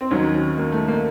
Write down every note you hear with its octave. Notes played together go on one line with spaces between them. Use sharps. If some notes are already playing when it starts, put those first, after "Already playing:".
C4
D#2 D#3 F#3 C#4
A#3
A3
A#3